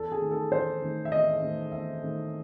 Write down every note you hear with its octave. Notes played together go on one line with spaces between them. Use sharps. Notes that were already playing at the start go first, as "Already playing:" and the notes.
Already playing: E2 A4
G#4
D#3 A3
A4
E2 C5
D#3 A3
E5
E2 D#5
D#3 A3
E2 E5
D#3 A3